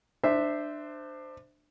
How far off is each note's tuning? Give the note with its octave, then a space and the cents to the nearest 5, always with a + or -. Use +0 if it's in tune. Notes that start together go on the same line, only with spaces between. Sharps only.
D4 +20 C5 -10 E5 +0